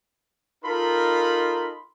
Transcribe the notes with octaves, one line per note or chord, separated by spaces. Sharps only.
D#4 F4 A4 A#4 B5 C6